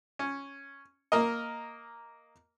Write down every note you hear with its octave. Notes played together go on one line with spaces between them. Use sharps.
C#4
A#3 A#4 D#5